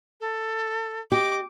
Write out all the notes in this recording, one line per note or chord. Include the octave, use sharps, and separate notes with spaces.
A4
G4 D#5 D6